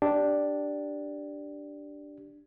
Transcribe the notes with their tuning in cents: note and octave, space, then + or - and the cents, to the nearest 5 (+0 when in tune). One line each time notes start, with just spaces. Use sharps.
D4 +0 G4 +0